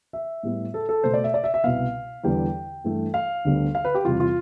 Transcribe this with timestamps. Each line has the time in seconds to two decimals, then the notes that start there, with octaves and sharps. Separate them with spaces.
0.13 E5
0.43 A2 G3 B3
0.74 A4
0.89 A4
1.04 B2 A3 C5
1.14 D5
1.24 E5
1.34 D5
1.44 E5
1.54 E5
1.64 C2 B2 B3 F5
2.24 E2 D3 G3 B3 G5
2.84 G2 E3 A3
3.14 F5
3.45 D2 D3 G3 B3
3.75 F5
3.85 B4
3.95 G4
4.05 E2 C3 G3 F4
4.20 F4